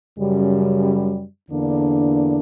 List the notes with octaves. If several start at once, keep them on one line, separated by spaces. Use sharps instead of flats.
F#2 C#3 G3
E2 D3 A#3 D4